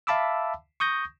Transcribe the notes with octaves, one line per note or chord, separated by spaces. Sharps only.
E5 F5 A5 B5 D6 E6
C#6 D#6 G6 A#6